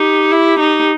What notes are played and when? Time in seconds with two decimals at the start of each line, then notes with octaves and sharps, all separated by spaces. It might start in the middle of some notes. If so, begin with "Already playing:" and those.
Already playing: D#4 G4
0.32 E4
0.59 D#4